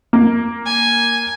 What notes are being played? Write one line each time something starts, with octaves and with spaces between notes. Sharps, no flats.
A#3
G#5